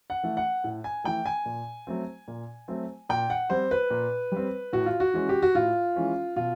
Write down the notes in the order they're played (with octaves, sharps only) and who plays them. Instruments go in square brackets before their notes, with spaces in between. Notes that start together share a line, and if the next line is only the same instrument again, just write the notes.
[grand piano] F#5
E3 A3
F#5
A2
G#5
E3 A3 G5
G#5
A#2
F#3 A3 C4
A#2
F#3 A3 C4
A#2 G5
F#5
G3 C4 C5
B4
A#2
G3 C4
A2 F#4
F4
F#4
E3 G#3 C#4
G4
F#4
A2 F4
E3 G#3 C#4
B2 F4